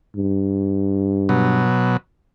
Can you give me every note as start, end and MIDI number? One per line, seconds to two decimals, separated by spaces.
0.16 1.69 43
1.29 1.97 47
1.29 1.97 54